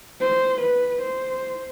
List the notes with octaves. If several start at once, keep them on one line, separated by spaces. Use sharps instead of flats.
C5
B4
C5